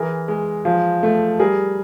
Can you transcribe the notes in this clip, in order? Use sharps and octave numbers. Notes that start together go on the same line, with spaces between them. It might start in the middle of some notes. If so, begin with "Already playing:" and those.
Already playing: E3 G#4 A#4
G#3
F3
A3
G3 G#4 A#4